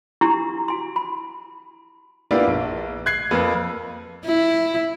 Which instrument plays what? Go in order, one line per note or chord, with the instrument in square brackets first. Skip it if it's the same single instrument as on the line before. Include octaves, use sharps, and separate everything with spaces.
[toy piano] D4 E4 G4 A#5 C6 C#6
F#4 G#5 C6
B5
[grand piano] A#3 B3 D4 E4 F4 G4
A#1
F#6 G#6 C7
F2 A#3 B4
[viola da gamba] E4